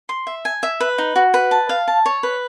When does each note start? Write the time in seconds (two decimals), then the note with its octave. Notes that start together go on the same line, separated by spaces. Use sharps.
0.09 C6
0.27 E5
0.45 G#5
0.63 E5
0.80 B4
0.98 D#4
1.16 F#4
1.34 B4
1.51 A5
1.69 F5
1.88 A5
2.06 C#5
2.23 B4